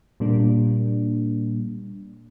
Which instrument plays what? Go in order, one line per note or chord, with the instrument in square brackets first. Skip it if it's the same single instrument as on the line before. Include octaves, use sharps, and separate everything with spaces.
[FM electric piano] A#2 G3 A#3 D4